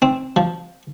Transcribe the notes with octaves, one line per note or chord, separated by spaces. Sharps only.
C4
F3